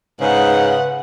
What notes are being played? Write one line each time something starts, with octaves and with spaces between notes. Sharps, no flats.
G#2 C#3 B4 F#5